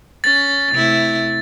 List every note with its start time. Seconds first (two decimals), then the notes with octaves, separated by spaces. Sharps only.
0.24 C#4 A6
0.72 C3 A3 E4